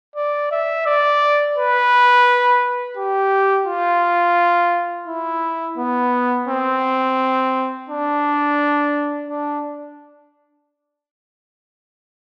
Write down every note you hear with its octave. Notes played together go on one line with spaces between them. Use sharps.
D5
E5
D5
B4
G4
F4
E4
B3
C4
D4
D4